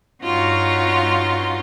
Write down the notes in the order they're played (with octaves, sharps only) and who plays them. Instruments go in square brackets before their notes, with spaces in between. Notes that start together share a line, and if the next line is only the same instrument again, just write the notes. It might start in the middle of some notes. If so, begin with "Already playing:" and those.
[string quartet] G2 C#4 D#4 F4 F#4